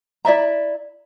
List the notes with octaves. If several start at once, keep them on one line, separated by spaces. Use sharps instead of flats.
E4 D5 E5 A#5